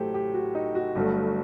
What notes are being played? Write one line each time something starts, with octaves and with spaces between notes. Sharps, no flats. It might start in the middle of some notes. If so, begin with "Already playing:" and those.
Already playing: A1 A2 F#3 A3 G4 A4 C5
G4
F#4
D#4
F#4
G1 G2 F#3 A3